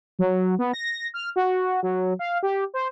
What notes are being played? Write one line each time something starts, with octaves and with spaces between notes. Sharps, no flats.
F#3
B3
A#6
F6
F#4
F#3
F5
G4
C5